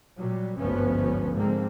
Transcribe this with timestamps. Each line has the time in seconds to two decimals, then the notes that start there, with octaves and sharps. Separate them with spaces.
0.17 A#2 F#3 G3
0.58 G#1 D2 G2 F3 B3 C#4
1.34 G#2 D3 F3 G#3 A#3 C4